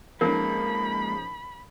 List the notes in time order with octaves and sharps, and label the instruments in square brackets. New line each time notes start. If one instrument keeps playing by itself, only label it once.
[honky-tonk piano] F3 C#4 D#4 [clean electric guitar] G#3 A#3 [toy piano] A#4 [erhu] B5